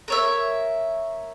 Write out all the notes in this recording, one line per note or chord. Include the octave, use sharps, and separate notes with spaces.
A#4 C#5 E5